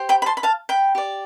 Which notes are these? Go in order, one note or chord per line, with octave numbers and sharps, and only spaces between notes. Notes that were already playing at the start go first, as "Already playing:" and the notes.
Already playing: G4 C5
G5 B5
B5
A5 C6
B5
F5 A5
G5 B5
G4 D5